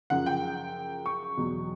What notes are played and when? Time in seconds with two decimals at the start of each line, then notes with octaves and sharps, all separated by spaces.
0.10 F#2 C#3 F3 F#5
0.26 G5
1.06 C#6
1.37 E2 B2 F#3